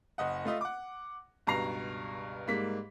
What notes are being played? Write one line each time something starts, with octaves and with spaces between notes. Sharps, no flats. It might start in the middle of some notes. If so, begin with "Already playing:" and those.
F#1 D#5 F#5
A3 F4 D#5 E5
F#5 D6
C#2 G2 B2 A#5 C7 F7
G#2 G3 A#3 B6